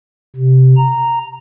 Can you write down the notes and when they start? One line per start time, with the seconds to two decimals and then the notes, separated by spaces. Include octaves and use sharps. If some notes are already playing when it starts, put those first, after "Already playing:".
0.36 C3
0.77 A#5